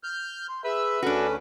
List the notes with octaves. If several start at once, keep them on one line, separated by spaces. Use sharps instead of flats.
F6 G6
C6
G#4 B4 E5 E6
D2 C#4 D4 F#4 A4